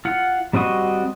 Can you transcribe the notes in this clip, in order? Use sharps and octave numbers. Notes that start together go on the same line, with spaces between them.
F4 F#5
G3 C4 F#4 D#5 C#6